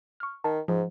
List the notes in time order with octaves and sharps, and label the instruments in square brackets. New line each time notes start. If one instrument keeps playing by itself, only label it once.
[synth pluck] C#6 F6
[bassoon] D#3 [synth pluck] A5
[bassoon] G#2 [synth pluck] F3